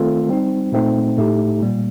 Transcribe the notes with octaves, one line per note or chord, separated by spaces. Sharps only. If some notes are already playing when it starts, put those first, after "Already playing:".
Already playing: D#3 A3 C4 F4 A4
G3 C4 D#4
A#2 A3 C4 D#4
A2 A3 D#4 G4
A#2 G3 A#3